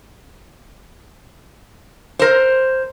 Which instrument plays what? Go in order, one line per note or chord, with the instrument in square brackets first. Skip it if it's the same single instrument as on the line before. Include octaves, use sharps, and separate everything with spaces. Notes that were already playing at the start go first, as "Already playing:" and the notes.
[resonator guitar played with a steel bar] A#4 C5